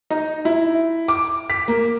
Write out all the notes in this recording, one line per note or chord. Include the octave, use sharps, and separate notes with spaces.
D#4
E4
D6
B6
A#3